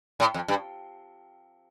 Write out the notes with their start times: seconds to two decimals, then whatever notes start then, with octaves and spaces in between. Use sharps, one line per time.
0.20 A2
0.34 F2
0.48 G2